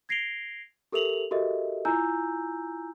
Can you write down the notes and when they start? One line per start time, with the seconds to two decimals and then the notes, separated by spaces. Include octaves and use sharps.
0.09 G#6 A#6 C7 D7 F7 G7
0.92 G4 A4 A#4 E5 F7 F#7
1.31 F#4 G4 A4 A#4 D#5 E5
1.85 E4 F4 G#5 A#5 E6 G6